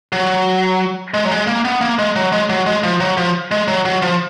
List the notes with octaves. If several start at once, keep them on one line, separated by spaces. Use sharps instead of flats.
F#3
G#3
F#3
G#3
A#3
B3
A#3
G#3
F#3
G#3
F#3
G#3
F3
F#3
F3
G#3
F#3
F#3
F3